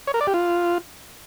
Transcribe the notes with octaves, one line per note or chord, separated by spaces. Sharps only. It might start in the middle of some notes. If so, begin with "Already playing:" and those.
C#5
A#4
D5
G4
F4